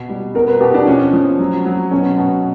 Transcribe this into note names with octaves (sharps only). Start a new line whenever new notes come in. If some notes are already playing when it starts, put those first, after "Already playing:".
Already playing: B2
G3
B2 A#4
B4
B2 G4
D4
F3 C#4
F3
F#3
F#3
B2 C#4
B2